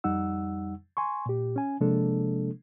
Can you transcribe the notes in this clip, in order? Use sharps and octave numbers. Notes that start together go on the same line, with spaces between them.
F2 G3 D#4 F#5 E6
G#5 C6 C#6
A#2 G4
C#4 G#5
C3 F3 G#3 A#3 D4 A4